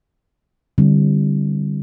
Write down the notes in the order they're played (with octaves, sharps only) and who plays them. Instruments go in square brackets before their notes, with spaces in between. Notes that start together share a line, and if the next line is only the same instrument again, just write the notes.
[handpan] D3 G3 C4 E4